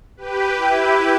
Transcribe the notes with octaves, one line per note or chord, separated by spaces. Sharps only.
G4 B4
E4 G4